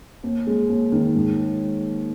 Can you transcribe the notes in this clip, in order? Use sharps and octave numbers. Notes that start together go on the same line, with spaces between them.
D#2
G#3
D#2
D#3
G#2